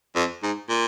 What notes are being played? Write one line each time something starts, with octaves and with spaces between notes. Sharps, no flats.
F2
G#2
A#2